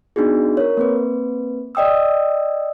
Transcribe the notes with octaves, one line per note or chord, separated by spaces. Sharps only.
B3 D4 D#4 F#4 G#4
A#4 C#5
A#3 C4 B4
D5 D#5 G5 D#6 E6